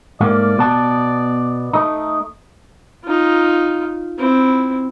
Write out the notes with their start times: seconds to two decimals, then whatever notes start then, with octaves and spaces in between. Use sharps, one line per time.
0.21 G#2 A3 A#3 D5
0.58 B2 B3 A5
1.73 A3 D#4
3.05 D#4 F4
4.18 C4 E4